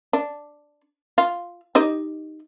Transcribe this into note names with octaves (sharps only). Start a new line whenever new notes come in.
D4
F4
D#4 G4 D#5